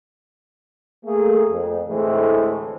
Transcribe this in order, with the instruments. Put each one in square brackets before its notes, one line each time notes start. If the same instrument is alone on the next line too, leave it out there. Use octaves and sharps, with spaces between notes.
[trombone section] A3 A#3 G#4
F2
D2 A2 E3 G#3 A3 C4